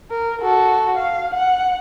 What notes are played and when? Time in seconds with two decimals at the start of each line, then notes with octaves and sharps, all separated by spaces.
0.11 A#4
0.41 F#4 A4
0.98 F5
1.35 F#5